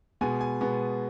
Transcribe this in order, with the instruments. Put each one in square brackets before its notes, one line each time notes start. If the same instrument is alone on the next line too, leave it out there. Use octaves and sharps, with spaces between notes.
[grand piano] B2 G#3 B3 G#5
G#5
B2 G#3 B3